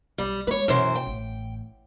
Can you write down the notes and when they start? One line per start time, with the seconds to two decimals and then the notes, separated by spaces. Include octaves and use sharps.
0.18 B1 G3
0.47 G#3 F4 B4 C#5
0.68 F#2 B2 E3 C5
0.95 G5
1.07 A1